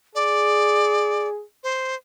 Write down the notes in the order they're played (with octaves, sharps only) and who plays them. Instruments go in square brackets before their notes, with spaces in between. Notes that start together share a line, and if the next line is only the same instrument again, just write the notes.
[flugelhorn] G#4 [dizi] D5
[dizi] C5